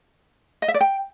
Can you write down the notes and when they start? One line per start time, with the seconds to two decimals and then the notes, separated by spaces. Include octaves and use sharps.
0.62 D#5
0.68 E5
0.74 D5
0.81 G5